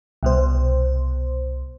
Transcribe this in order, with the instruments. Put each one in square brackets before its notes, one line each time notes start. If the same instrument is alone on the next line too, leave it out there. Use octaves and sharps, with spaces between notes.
[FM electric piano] C2 B2 C5